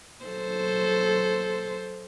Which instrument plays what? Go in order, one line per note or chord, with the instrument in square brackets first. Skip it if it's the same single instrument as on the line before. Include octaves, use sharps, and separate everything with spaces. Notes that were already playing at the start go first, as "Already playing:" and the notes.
[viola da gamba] F#3 A4 C5